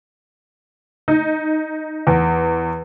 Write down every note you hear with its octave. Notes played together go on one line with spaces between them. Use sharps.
D#4
E2